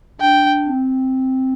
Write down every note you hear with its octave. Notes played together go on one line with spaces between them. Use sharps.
D4 G5
C4